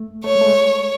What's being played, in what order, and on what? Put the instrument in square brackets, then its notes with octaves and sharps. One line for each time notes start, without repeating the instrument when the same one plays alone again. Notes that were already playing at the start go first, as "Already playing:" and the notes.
Already playing: [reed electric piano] A3
[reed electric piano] A3 [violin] C#5
[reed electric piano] G#3
A3
G#3